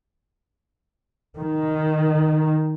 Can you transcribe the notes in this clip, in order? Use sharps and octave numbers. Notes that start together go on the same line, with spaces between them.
D#3